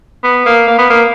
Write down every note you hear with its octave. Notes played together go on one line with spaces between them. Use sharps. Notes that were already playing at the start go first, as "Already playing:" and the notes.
B3
A#3
A#3
B3
A#3